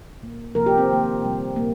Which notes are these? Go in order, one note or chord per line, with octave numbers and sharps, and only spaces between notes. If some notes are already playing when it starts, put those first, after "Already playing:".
A#2 A#3
C3 F3 A#3 A#4
G4
C4
D#3 A#3
C3 G3 A#3
A#2 A#3